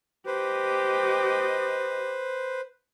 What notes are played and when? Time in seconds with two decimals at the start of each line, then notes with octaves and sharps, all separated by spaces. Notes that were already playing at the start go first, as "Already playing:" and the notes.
0.26 G4 B4 C5 D#5